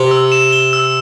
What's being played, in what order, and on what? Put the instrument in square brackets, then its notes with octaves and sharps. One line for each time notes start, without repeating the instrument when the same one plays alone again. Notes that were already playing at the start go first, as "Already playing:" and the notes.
Already playing: [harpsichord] C3 [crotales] G7
[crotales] E6
E7
G7
E6